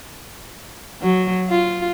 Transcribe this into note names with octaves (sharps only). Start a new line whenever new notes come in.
F#3
F4